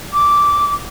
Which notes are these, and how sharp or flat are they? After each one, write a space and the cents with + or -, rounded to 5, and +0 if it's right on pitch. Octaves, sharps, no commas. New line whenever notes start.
D6 -10